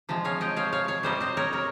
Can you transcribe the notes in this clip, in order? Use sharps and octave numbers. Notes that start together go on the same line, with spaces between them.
C3 F3 G#3
C#5 F5
D#5 G5
C#5 F5
C#5 F5
C#5 F5
C3 G3 C5 D#5
C5 D#5
A#4 C#5
A#4 C#5